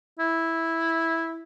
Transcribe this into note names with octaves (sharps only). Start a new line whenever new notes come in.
E4